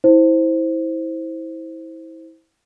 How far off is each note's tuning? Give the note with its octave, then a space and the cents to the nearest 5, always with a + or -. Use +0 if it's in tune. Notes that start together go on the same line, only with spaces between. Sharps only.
E4 -25 C5 +0